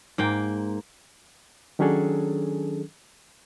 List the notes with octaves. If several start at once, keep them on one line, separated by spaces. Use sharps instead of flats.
G#2 A#3 G5
D#3 F#3 C#4 D4 G#4 A4